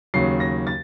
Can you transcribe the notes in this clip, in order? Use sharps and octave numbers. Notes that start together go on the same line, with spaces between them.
D#2 C#3 F#3 C7
A#6
A6